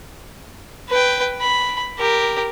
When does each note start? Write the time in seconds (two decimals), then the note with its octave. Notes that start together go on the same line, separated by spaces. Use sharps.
0.89 B4 G5
1.41 B5
1.99 G4 A#4